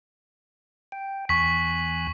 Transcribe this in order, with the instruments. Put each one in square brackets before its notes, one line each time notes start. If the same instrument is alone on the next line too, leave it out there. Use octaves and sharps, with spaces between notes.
[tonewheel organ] G5
[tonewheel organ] E2 G#5 F#6 [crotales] C#6 B6